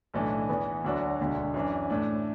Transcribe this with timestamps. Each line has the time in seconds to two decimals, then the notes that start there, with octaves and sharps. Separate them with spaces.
0.14 B1 A2 E3 A3 D4
0.49 E2 E3 B3
0.84 D2 D3 F#3 D4 F#4
1.20 E1 D2 D3
1.54 F#2 E3 D4
1.90 A2 A3 D4